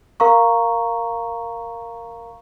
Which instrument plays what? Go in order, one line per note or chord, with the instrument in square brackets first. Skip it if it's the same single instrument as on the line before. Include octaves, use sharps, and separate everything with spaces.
[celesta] A#4 F5 A#5 C#6